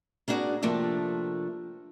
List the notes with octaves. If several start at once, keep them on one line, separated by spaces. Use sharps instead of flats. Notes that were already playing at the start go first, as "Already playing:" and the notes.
A#3 D4 E4 F#4 G#4 D5
C3 F3 A3 A#3 D4